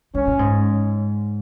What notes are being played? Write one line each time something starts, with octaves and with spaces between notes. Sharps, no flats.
G#2 C#4
A#2
G#2